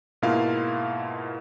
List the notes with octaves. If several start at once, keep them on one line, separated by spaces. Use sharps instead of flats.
G#2 B2 A#3 E4 F4 F5